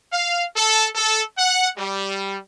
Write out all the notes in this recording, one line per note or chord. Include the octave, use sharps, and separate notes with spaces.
F5
A4
A4
F#5
G3